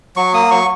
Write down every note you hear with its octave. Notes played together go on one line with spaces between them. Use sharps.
F#3 C#6
A#3 D#6
F#3 C#6